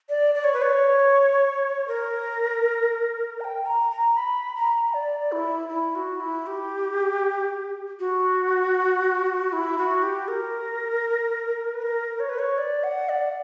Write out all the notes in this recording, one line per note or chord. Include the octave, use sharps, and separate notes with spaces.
D5
D5
C#5
B4
C#5
A#4
A#5
G5
A#5
A#5
B5
A#5
D5
E4
E4
F#4
E4
G4
F#4
E4
F#4
G4
A#4
B4
A#4
C#5
B4
C#5
D5
F#5
D5